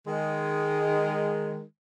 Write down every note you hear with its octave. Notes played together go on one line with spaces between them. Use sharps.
D#3 G#3